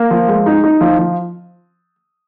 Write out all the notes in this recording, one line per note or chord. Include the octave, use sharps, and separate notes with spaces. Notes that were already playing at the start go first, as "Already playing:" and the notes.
Already playing: A#3
F3
G#3
D#4
D#4
F3
F3